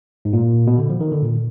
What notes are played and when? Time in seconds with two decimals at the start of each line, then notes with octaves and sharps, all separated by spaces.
0.25 G#2
0.33 A#2
0.67 B2
0.78 D3
0.90 F3
1.01 D#3
1.12 D3
1.23 A#2